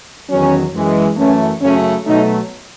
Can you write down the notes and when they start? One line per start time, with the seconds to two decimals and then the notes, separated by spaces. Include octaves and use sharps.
0.29 E2 D#3 F#3 C#4
0.73 F#2 E3 G#3
1.16 F#2 E3 A3 C#4
1.61 F#2 C#3 F#3 A3 C#4
2.04 B2 F#3 A3 D#4